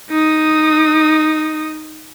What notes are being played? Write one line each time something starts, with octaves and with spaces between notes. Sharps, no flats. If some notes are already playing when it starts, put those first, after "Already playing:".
D#4 D#6